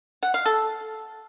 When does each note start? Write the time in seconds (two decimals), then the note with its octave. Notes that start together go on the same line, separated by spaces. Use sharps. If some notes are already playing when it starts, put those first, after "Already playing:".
0.23 F#5
0.34 F5
0.46 A4